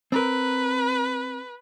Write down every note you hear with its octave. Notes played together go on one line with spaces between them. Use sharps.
C4 A#4 B4